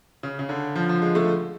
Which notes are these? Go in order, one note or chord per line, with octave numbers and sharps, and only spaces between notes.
C#3
C#3
D3
F3
F3
G#3
A3